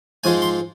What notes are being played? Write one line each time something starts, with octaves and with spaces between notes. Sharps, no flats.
G#2 F3 G#3 G#5
C6